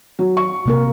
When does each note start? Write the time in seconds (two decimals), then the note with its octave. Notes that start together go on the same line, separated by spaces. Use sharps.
0.19 F#3
0.37 C#6
0.66 C3 A#3 A#4